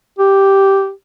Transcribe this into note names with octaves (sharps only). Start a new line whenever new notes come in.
G4